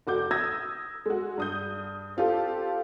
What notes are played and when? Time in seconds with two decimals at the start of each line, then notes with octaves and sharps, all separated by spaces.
0.07 F1 F#4 D6 G6
0.31 D#6 E6 G#6 A#6
1.06 G#3 F#4
1.38 G2 D#6 G6
2.17 C4 F4 G4 A4